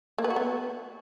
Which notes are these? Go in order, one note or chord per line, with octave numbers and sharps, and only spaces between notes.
A#3
B4
F#4
B3